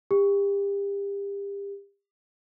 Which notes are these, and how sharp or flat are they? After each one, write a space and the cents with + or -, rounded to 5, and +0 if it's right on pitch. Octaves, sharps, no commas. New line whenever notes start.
G4 +35